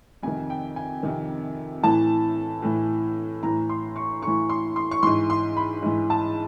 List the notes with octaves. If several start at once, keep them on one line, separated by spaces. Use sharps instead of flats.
F2 C3 D#3 G#5
G5
G#5
F2 C3 D#3
A2 E3 A5
A2 E3
A2 E3 A#5
C6
C#6
A2 E3 C#6
C6
C6
C#6
G#2 E3 C6
C6
B5
G#2 E3
A5